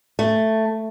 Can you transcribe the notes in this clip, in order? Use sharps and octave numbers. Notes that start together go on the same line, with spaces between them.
A3